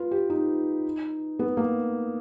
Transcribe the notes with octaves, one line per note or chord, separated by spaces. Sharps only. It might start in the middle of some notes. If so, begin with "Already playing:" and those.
Already playing: F4 B4
G4
D#4
B3
A#3